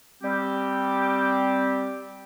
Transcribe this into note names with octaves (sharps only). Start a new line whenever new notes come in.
G3 C4 G4